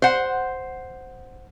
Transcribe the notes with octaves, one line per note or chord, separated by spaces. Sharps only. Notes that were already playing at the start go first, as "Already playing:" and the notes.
C5 F#5